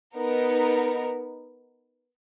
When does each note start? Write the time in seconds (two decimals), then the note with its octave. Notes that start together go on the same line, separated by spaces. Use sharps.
0.15 B3 D#4 A#4